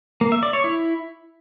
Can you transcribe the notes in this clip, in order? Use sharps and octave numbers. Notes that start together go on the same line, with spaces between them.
A#3
E5
D5
C#5
E4